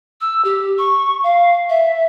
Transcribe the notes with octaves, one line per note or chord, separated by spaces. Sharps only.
E6
G4
C#6
F5
E5